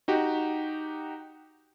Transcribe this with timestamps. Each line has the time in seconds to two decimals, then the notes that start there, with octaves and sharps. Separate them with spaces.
0.08 D#4 F#4 G4